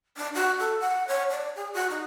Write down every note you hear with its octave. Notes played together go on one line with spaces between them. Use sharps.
D4
F#4
A4
F#5
C#5
D5
G#4
F#4
D#4